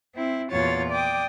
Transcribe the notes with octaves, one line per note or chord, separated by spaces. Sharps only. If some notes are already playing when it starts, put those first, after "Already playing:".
C4 E4
E2 A#2 F4 F#4 C#5 A6
D5 G5 D6 D#6